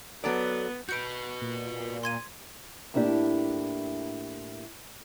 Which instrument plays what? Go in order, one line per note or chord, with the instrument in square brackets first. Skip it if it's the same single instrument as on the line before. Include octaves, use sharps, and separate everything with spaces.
[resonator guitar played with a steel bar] F#3 A4 D5 [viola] B3
[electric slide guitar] F#4 B4 [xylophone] G6 C#7 D7
[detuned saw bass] A#2
[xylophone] C6 G#6 D#7
[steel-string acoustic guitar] A2 A#3 D4 E4 G4